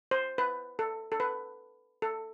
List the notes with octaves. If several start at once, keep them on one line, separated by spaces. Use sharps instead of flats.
C5
B4
A4
A4
B4
A4